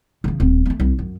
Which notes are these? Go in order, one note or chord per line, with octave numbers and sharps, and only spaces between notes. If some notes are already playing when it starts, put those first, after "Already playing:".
C#3 E3
D#1 C4
A3 A#3
C2
F#2